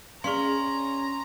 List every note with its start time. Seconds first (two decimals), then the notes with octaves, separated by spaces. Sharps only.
0.24 C#4 G#4 D5 F5 A#5 C6 C#6